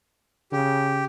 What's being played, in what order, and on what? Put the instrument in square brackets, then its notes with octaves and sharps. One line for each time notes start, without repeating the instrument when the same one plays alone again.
[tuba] C#3 [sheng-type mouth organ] G4